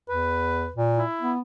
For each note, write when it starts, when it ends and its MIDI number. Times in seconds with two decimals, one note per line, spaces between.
0.09 0.68 40
0.09 0.72 71
0.76 1.03 46
0.98 1.32 64
1.21 1.40 59